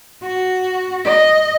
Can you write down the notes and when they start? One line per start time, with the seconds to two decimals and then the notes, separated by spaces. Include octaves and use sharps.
0.23 F#4
1.05 D#5